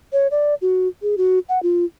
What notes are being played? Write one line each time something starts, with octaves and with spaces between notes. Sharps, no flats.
C#5
D5
F#4
G#4
F#4
F#5
F4